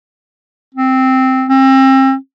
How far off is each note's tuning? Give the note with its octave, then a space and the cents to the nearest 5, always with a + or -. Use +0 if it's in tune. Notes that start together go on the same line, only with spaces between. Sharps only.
C4 -5
C4 +35